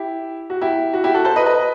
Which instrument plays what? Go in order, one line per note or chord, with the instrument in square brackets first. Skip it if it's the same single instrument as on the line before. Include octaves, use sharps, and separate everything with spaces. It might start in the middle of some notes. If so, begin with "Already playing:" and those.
Already playing: [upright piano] E4 G4
F#4
E4 G4
F#4
E4 G4
F#4 A4
A4 C5
B4 D#5
B4 D#5